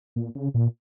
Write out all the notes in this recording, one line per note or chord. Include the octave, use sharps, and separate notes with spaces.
A#2
C#3
A#2